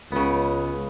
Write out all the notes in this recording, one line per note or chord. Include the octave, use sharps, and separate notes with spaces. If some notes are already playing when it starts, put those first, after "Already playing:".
C#2 C#3 B3